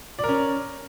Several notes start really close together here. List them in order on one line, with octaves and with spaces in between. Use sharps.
D5 A#4 C#4